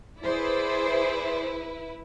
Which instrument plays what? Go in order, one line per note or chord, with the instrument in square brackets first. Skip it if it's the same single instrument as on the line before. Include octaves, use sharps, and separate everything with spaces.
[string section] E4 B4 [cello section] G#4 C5 D5